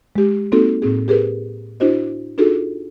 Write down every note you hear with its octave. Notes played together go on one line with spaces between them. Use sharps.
G#3 G4
A#3 C4 D#4 F#4 A4
A2 C4 G#4
G4 G#4 A#4 B4
D4 E4 F#4 C5 D#5
D4 D#4 F4 F#4 G#4 A4